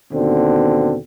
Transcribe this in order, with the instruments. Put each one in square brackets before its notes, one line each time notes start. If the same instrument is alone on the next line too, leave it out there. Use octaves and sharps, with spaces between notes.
[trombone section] D#2 B2 D3 C4